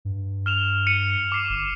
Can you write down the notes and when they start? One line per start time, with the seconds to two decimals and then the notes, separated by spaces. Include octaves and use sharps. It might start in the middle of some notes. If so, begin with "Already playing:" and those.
0.05 G2
0.46 F6 E7 F7
0.87 C#7 D#7 F#7
1.32 D6 C7
1.49 G1